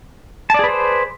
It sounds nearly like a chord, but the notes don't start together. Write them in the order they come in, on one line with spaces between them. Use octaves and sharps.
A5 D5 G#4 B4 C5